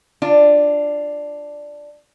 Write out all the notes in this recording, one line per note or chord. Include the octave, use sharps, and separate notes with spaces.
D4 F4